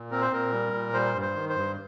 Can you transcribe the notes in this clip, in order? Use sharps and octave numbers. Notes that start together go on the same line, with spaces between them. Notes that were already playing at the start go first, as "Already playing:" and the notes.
Already playing: A#2
C4 A#4
C5
A#2 A#4
G3
A#2
G3 C5
G2
C5
D#3
C5
G2